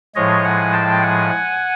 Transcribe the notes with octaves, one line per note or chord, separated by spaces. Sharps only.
A2 F3 G#3 C#5 D#5
F#5 G#5
G5 A5
F#5 G#5